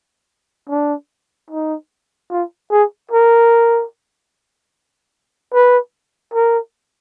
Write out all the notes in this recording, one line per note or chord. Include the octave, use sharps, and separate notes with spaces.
D4
D#4
F4
G#4
A#4
B4
A#4